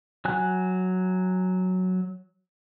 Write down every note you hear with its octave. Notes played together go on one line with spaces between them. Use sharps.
F#3 G#5 F#6